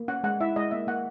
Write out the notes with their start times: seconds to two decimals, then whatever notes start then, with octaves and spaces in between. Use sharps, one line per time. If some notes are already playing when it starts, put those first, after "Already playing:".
Already playing: A#3
0.08 C#4 F#5
0.24 G#3 F#5
0.40 E4 E5
0.56 G#3 D#5
0.71 A#3 E5
0.87 A#3 F#5